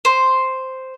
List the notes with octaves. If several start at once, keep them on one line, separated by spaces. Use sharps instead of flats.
C5